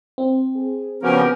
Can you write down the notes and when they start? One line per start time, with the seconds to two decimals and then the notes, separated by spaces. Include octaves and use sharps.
0.18 C4
0.56 G#4
1.03 C#3 F3 B3 C#4 F#4 G4 A#4